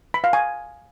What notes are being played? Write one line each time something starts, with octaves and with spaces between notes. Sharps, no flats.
B5
F5
G#5